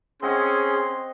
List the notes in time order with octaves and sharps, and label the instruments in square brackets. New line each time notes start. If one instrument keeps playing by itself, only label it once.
[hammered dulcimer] C4 D#5 F#5 [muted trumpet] C#4 [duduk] G#4 [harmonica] C6